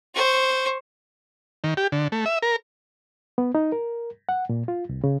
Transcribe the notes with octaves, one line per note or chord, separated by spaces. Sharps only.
C5 C#6
D#3
G4
D3
A3
E5
A#4
B3
D#4
A#4
F#5
A#2
F4
C2
C#3